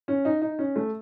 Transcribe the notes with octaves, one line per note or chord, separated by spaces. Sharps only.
C#4
D#4
D#4
C#4
A3